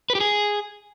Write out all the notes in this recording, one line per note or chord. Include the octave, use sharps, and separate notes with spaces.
B4
G4
G#4